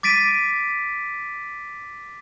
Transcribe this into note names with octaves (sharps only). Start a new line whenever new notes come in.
D6 A6 B6 D7 D#7